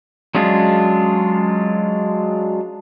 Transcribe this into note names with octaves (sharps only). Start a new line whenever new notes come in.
F#3 G#3 C#4 D4 F4